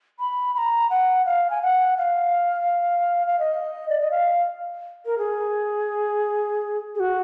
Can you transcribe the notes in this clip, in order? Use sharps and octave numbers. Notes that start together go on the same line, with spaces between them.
B5
B5
A#5
F#5
F5
G#5
F#5
F5
F5
D#5
D5
D#5
F5
A#4
G#4
G#4
F#4